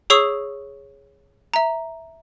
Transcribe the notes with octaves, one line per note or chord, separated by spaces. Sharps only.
G#4 C#5 C#6 D#6 E6 C7
E5 A#5